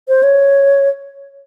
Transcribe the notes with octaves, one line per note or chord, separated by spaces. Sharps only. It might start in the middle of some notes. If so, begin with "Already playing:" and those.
C5
C#5